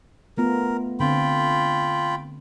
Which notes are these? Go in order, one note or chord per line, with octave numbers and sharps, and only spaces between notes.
A3 B3 F4 A#4
D3 C4 F4 G5 B5